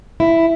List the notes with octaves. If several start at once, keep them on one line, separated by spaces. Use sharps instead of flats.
E4